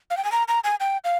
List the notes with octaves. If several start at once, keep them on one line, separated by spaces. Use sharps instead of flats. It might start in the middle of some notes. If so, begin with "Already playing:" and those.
F5
G5
G#5
A#5
A#5
G#5
G5
F5